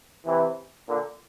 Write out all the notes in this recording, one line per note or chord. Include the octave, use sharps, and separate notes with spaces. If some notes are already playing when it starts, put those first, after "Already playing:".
C3 E3
A#2 D3